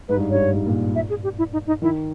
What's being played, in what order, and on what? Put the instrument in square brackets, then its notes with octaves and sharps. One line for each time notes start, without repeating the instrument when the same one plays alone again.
[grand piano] G#2 [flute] B4
[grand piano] G2
[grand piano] G2 [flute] C#5
[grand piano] G#2
A#2
[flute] E5
G#4
G4
E4
D#4
D#4
[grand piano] D#3 [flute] E4